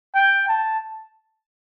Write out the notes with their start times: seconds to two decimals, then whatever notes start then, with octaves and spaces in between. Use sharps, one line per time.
0.14 G5
0.48 A5